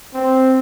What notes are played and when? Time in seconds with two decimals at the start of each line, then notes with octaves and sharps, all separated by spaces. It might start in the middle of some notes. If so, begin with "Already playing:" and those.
0.15 C4